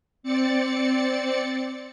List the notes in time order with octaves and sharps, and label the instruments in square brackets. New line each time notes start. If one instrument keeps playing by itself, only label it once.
[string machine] C4 D5 A6 C#7